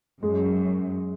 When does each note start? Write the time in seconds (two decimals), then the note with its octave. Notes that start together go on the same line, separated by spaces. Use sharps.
0.23 F#2 G#3